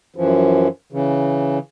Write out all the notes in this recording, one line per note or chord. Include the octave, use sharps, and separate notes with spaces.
F#2 E3 F3
C#3 E3